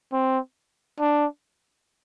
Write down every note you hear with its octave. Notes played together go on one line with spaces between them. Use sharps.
C4
D4